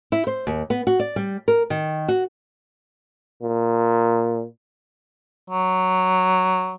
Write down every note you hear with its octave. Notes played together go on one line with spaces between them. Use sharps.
E4
C5
D#2
B3
F#4
D5
G3
A#4
D#3
F#4
A#2
F#3